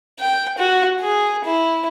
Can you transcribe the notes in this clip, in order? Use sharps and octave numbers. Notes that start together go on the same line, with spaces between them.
G5
F#4
G#4
E4